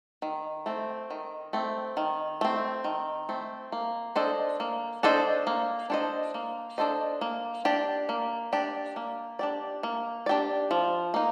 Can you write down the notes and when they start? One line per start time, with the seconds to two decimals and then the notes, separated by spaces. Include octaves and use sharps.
0.22 D#3
0.66 A3 C4
1.11 D#3
1.53 A3 C4
1.97 D#3
2.41 A3 C4
2.84 D#3
3.29 A3 C4
3.72 A#3
4.16 D4 A4 C5 D#5
4.60 A#3
5.03 D4 A4 C5 D#5
5.47 A#3
5.90 D4 A4 C5 D#5
6.34 A#3
6.78 D4 A4 C5 D#5
7.21 A#3
7.65 D4 G4 D5
8.09 A#3
8.53 D4 G4 D5
8.96 A#3
9.39 D4 G4 D5
9.83 A#3
10.26 D4 G4 D5
10.71 F3
11.14 A#3 D#4